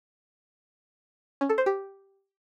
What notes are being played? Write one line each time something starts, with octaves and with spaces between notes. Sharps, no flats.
C#4
A4
C5
G4